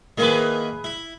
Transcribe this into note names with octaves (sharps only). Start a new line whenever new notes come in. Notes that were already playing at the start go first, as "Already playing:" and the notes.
D#3 A#3 E4 G#4 B4
E4